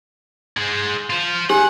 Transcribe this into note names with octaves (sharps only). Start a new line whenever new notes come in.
G#3 C5
F4 C5
G4 F#5 G#5